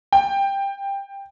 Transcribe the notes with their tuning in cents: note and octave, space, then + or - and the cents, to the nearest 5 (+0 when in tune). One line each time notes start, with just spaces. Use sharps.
G5 +15